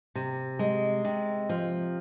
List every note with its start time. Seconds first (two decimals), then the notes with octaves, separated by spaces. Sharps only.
0.15 C3
0.59 G#3
1.05 C3
1.49 F3